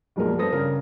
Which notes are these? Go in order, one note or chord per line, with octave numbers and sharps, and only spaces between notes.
F1 B1 A#2 G#3 A#4
G2 B3 A4 C5 D#6 A#6
G2 C#3 A#4